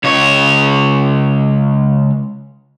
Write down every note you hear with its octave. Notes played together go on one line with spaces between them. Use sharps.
C#2 C#5